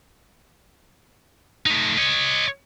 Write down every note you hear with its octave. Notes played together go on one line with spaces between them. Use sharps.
A3 D#4
C#5 D#5